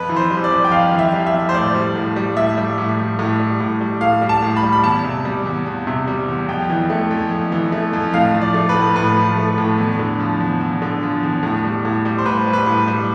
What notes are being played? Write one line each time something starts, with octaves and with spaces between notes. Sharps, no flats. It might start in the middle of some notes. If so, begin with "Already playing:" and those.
Already playing: F2 B4
E3
C5
G3
D5
F2
G5
F2 F5
E3
E5
G3
E5
F2
C5
A2 D5
G3
A2
G3
A2 E5
G3
A2
G3
A2
G3
A2
G3
A2 F5
G3
A5
A2
B5
G3
B5
E2 A5
C3
G3
E2
E2
C3
G3
E2
F2 G5
E3
A3
F2
F2
E3
A3
F2
A2 F5
F3
D5
A3
B4
A2
A2 B4
F3
A3
A2
E2
D3
F3
E2
E2
D3
F3
E2
A2
G3
A2
G3
C5
A2 B4
G3
B4
A2
G3